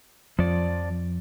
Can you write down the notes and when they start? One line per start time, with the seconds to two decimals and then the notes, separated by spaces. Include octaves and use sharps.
0.39 F2 F3 D5